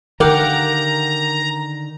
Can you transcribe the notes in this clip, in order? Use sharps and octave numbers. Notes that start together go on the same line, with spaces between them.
D3 D#3 G4 A#4 F5 F#5 A#5